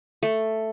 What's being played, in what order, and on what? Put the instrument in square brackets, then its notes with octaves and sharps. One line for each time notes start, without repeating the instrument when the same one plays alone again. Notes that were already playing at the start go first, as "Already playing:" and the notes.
[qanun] A3